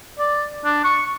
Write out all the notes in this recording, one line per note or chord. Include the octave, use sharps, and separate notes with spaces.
D5
D4
C#6